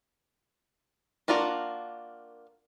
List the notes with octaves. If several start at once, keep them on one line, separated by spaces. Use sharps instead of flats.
A#3 D4 F4 F#4 A#4